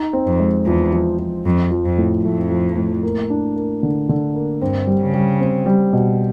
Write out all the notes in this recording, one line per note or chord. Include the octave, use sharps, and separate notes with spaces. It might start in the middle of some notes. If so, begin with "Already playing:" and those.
Already playing: D#4
C4
F2
G#3
E2 F3
F3
F3
F2 F3
F3
F2
A2
F2 A3
F3
A2
A#3
D4
A#3
D3
D3
A#3
G2 C4
G3
C#3
G3
C4
G3
B2